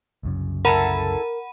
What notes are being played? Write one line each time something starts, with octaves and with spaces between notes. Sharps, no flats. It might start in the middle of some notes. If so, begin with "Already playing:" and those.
C2 F#2 C#3
E4 A4 A#4 F#5 A#5 B5 D#7